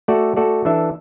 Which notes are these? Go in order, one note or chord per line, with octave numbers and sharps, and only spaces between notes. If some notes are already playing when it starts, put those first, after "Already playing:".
A3 F#4 A4 D5
A3 F#4 A4 D5
E3 D4 A4 E5